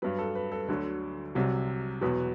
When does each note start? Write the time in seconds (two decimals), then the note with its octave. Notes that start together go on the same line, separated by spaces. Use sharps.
0.02 G2 F#3 B4
0.19 A4
0.35 B4
0.52 A4
0.68 D2 D3 F#3
1.35 C2 C3 F#3
2.01 E2 B2 F#3 B4